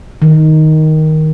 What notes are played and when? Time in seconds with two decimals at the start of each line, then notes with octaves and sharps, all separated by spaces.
0.22 D#3